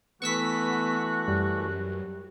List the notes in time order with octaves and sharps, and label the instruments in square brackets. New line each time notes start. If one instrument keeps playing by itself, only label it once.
[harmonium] E3 A3 [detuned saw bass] B3 [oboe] F#4 [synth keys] C#6 E6 B6
[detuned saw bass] F#2 [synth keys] G3